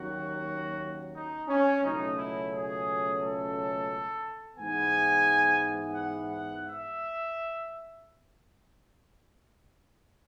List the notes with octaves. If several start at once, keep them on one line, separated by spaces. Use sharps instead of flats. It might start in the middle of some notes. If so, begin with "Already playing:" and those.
Already playing: D#2 D#3 F#3 C#4 F#4
D#4
C#4
C#2 B2 F#3 A3 C#4 D#4
E4
G#4
A4
G#2 E3 B3 G#5
F#5
F#5
E5